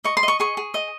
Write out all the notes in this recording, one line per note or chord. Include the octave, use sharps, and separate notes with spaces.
D#5 C#6
C6
D#5
C#6
G#4 C#6
G#4
D#5